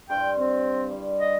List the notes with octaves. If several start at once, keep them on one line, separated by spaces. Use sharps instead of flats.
G2 C5 G5 C6
C4
G3
D#5